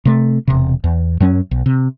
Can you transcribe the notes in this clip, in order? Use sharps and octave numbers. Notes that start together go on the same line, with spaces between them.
C3 A3
E1 C3
E2
F#2 F#3 C#4
B1
C3